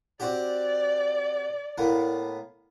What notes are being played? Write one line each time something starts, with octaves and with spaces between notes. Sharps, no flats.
C4 F#4 G4 D5
A2 A#3 B3